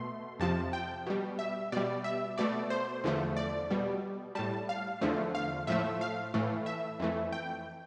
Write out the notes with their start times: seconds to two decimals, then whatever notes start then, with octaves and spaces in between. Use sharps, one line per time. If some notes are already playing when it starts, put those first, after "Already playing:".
Already playing: B2 A3 C6
0.40 F2 C3 F3 A5
0.73 G5
1.07 B2 G3
1.39 E5
1.72 B2 G3 D5
2.04 E5
2.38 B2 A3 D5
2.70 C5
3.04 E2 D3 F3 A3
3.37 D5
3.70 B2 G3
4.35 A2 G3 A5
4.69 F5
5.01 E2 D3 F3 A3
5.35 F5
5.67 A2 F3 A3 E5
6.01 F5
6.34 A2 E3 A3
6.66 E5
7.00 F2 E3 A3
7.32 G5